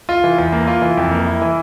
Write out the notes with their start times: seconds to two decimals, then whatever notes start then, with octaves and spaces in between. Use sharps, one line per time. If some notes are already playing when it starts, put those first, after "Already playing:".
0.09 F4
0.24 E3
0.38 E2
0.52 A#3
0.67 F4
0.82 E3
0.97 F2
1.11 A#3
1.26 E4
1.42 E3